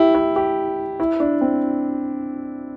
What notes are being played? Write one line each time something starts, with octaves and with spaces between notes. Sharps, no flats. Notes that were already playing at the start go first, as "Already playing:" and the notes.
Already playing: E4 G4
E4
G4
E4
D4
C4